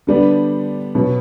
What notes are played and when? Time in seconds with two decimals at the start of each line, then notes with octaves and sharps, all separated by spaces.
0.07 D3 G3 B3 D4
0.95 B2 F#3 B3